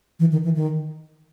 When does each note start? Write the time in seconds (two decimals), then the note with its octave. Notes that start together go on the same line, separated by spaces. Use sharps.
0.20 E3
0.32 D#3
0.44 E3
0.56 D#3